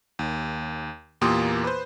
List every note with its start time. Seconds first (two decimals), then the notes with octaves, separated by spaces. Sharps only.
0.19 D#2
1.21 E2 A#2 A#3 G4 C6 D#6
1.64 B4 C5